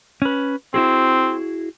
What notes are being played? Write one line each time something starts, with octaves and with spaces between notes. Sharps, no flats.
C#4 B4
C4 E4 F#4 G#4